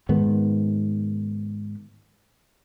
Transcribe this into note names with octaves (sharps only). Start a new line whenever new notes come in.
G#2 D#3 B3